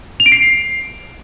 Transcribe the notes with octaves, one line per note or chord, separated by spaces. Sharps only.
F7
D7
C7